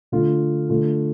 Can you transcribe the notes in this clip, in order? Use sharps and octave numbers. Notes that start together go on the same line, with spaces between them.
D3 A3 F4
D3 A3 F4